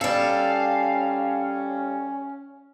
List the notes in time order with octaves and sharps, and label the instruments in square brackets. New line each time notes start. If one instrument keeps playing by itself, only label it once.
[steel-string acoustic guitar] G3 A4 [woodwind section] C#4 [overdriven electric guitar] F5